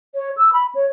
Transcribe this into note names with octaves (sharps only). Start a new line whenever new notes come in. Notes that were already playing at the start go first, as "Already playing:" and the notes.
C#5
E6
B5
C#5